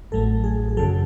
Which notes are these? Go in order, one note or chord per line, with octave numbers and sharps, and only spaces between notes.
A1 A2 F#3 A3 A4
G#4
G#4
F#2 C#3 F#3 A4